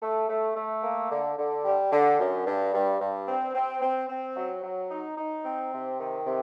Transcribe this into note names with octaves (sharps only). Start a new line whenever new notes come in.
A3
A3
A3
A#3
D3
D3
G3
D3
F#2
G2
G2
G2
C4
C4
C4
C4
F#3
F#3
D#4
D#4
C4
C3
D#3
C3